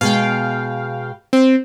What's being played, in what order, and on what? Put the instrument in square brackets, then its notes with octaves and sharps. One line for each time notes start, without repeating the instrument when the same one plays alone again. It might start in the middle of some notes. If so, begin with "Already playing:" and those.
[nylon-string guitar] B2 G#3 [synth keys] F5 G5
[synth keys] C4